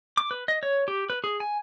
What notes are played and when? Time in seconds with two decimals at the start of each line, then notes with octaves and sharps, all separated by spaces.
0.17 D6
0.31 B4
0.48 D#5
0.63 C#5
0.88 G4
1.10 B4
1.24 G#4
1.40 G#5